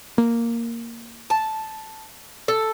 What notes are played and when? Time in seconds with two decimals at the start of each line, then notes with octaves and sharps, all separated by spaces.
0.18 A#3
1.30 A5
2.48 A4